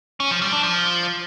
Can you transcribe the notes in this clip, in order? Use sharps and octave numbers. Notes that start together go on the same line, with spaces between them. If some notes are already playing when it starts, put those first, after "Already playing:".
C#4
F3
G3
D4
F3